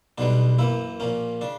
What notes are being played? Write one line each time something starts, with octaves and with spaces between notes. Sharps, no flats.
B1 B2 G3 B3 D4
F#2 E3 A#3 E4
A#1 A#2 A#3 C#4
C#3 D4